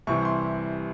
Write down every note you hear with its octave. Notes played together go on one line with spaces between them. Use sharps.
C2 C3 E3 G3 C#6
C6